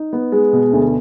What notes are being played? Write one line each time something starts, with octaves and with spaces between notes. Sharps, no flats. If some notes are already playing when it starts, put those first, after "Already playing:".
Already playing: D#4
B3
G#3
B2
D2